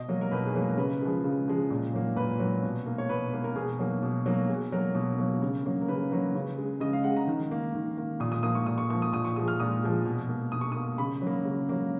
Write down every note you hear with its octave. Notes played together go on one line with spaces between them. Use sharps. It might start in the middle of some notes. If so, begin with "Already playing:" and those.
Already playing: B2 D#5
F#3 A#3
A#4
B2 B4
G#4
F#3 A#3
A#4
C#3 B4
F3 G#3
C#3
F3 G#3
A#2
F#3 A#3
A#2 B4
F#3 A#3
B2
A#3
C#5
B2 B4
A#3 B4
A#4
B2 G#4
F#3 A#3
B2
F#3 A#3
B2 G#4
F#3 A#3 A#4
B2
F#3 A#3
C#3
F#3 A#3
A#4
C#3 B4
F#3 A#3
C#3
G#3
C#3 D#5
F5
G#3 F#5
A#5
D#3
A#3
D#3
A#3
A#2 D#6
D#6
F3 A#3 D#6
C#6
A#2 D#6
C#6
F3 A#3 C#6
D#6
A#2 D#6
C#6
F3 G#3 D#6
F6
A#2 D#6
F3 G#3
B2
A#3
B2 D#6
C#6
A#3 D#6
C#3 B5
F#3 A#3
C#3
F#3 A#3